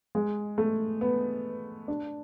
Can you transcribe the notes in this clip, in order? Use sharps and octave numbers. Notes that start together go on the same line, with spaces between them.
G#3
A3
B3
D4